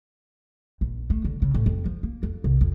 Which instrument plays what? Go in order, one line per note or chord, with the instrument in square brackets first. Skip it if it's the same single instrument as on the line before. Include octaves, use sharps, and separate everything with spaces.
[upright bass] A#1
A3
D3
C#3
A2
F2
F3
A#3
F2
C2
F2